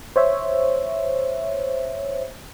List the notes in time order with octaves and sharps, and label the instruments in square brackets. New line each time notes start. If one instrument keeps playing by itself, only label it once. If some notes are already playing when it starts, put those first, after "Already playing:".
[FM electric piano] C5 C#5 E5